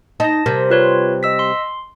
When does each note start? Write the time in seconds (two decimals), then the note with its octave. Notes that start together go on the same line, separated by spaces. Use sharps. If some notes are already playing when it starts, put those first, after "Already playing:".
0.20 D#4 A5 A#6
0.46 C3 G3 A#4
0.70 F4 B4 C#5
1.23 D#5 E6 B6
1.39 C6